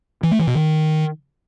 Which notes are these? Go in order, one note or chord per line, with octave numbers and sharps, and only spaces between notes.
E3
A3
E3
B2
D#3